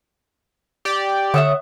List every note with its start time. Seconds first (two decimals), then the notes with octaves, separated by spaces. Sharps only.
0.85 G4 D5
1.34 D3 A3 C#5 E5 F#5 D#6